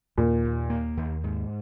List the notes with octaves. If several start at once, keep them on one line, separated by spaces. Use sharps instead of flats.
D#2 A#2
D#2
A#3
D#2
G#2